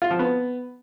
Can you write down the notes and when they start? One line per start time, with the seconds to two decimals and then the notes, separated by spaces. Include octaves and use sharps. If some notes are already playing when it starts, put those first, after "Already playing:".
0.02 F4
0.10 F3
0.19 B3